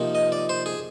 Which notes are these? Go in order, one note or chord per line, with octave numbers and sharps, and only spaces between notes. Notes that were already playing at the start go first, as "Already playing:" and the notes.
Already playing: C3 F3 A#3 D#4
D#5
D5
C5
G#4